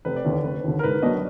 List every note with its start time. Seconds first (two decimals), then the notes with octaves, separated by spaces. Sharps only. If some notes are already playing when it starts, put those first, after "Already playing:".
0.05 F1 B4
0.16 D5
0.25 D#2 D3 B4
0.44 F1 B4
0.64 D#2 D3
0.79 A#4
0.83 G#2 B4
1.02 F#3 D4 D#5